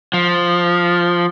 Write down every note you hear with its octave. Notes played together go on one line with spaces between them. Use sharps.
F3